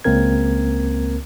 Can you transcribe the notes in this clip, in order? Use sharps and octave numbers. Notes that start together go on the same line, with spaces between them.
C#2 A#3 C4 A#4 G#6